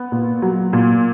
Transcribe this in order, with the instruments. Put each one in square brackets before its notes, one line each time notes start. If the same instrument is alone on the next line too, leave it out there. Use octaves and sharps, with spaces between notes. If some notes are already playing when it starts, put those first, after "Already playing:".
Already playing: [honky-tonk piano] B3
A#2
F#3
A#2